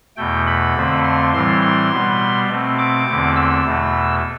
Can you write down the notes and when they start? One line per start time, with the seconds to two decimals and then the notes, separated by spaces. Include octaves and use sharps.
0.17 E2 B2 A3 G5
0.46 B5
0.75 F2 D3 A3 C4
1.03 C6
1.33 A2 E3 G3 C4 C6
1.61 C6
1.91 B2 G3 B3
2.48 B2 A3 C4
2.78 D6
3.07 E2 D3 A3 C4
3.36 E6
3.65 E2 B2 A3